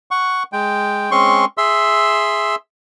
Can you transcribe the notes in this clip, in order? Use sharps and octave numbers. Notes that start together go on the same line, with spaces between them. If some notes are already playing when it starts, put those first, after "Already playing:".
F#5 C#6
G#3 G5
G#3 C4 C#4 C6 C#6
G#4 E5 C6 E6